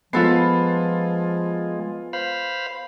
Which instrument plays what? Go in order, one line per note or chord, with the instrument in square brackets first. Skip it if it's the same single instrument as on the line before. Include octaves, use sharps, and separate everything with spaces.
[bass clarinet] F3 [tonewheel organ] G#3 [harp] B3 A4 [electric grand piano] F4 C7
[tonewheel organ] C5 F5 B5